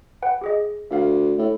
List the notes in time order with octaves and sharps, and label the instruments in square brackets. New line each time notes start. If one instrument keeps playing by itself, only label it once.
[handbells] B4 F#5 G5
G4 G#4 D#5
[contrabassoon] D2 [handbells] E5 F5
[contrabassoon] A2